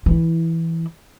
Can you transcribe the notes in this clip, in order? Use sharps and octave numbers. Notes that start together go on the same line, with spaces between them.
E3 E4